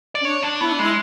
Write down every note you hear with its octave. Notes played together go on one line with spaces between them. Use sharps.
D5
C#4
D4 C#5
D4
B3 E4
D4
G#3 E4